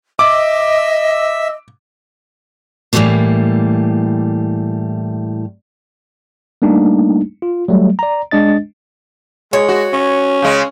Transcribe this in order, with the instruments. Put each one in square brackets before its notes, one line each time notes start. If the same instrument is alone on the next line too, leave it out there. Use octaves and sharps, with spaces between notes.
[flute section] D#5 [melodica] E5 E6 [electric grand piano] D6
[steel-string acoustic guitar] A2 E3 F3 G3 A3 A#3
[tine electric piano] G3 A3 A#3 D4 D#4
F4
F#3 G3 A3
D5 A#5
G#3 D4 D#5 A6
[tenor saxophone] G#3 [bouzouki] C#5
[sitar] F#4
[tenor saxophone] C#4
[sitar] C#3 G#3